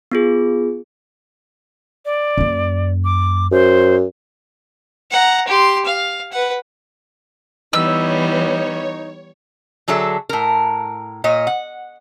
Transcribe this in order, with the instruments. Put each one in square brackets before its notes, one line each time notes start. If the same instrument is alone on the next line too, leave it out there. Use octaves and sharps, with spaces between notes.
[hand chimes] B3 F4 G#4
[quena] D5
[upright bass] F#2 A#3
[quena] D6
[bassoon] F#2 [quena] C5
[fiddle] F#5 A#5
G4 C6
F5
B4 F#5
[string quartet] E3 G3 B3 [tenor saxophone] D#4 [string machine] C#5 [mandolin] E6
[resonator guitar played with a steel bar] D3 F#3 G#4 A4 E5
A2 A#4
A#2 C#5 D#5
F#5